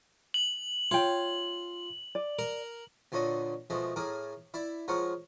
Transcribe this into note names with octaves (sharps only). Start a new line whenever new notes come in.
F#7
F4 C#5 G5
D5
A#4
D2 A#2 D3 C#5 D#5
B2 F3 G#3 A3
A2 G#4 A#4 D6
E4 D5 B5
F3 G#3 A#4 C#5 F#5